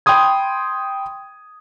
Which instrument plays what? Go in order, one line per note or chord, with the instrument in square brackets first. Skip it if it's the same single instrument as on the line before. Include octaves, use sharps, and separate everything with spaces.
[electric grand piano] G5 B5 C6 D#6 G#6